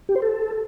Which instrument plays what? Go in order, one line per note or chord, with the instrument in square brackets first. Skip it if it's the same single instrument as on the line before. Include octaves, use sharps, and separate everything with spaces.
[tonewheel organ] G4
C5
A4